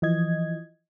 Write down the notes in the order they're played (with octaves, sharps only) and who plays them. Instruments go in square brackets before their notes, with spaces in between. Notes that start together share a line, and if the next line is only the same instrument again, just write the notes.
[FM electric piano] E3 F3 D#5 G#6